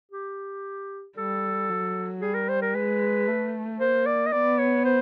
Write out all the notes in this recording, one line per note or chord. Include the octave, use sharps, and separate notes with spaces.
G4
G3 A4
F#3
G3 G#4
A#4
C5
A#4
G#3 B4
A3
A#3 C5
D5
D#5
B3 D5
C#5
C5